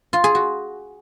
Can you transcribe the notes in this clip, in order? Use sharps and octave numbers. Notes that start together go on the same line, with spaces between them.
F4
G#4
F#4